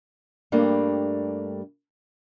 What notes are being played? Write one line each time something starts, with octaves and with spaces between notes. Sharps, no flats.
G2 G3 A3 A#3 D4